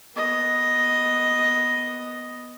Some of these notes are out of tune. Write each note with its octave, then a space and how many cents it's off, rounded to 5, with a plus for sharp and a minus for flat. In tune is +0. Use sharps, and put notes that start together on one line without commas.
B3 +0 D#5 +0